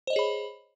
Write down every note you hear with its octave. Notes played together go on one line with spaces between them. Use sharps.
G#4 C5 C#5 D#5 B5